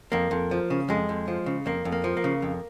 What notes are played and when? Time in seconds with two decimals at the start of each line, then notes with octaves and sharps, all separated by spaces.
0.12 F2 A#3
0.31 F2
0.51 F3
0.70 C#3
0.89 F2 G#3
1.09 F2
1.28 F3
1.46 C#3
1.66 F2 A#3
1.85 F2
1.92 A#3
2.04 F3
2.17 A#3
2.24 C#3
2.42 F2